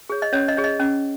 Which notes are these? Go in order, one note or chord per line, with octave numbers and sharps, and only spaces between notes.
G#4 C#5
D#5
C#4 C#5
D#5
G#4 C#5
D#5
C#4